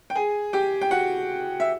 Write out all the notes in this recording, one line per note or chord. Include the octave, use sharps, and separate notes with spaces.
G5
G#4 G#5
G4 G5
G5
F#4 F#5
E5